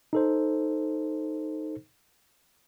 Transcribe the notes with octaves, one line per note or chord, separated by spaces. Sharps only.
D#4 A4 C5